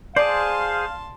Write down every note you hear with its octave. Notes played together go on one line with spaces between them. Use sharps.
G#4 C5 D5 F5 A5 C6